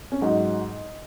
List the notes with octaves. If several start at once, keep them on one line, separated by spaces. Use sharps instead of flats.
C#4
G#2 F#3 D#4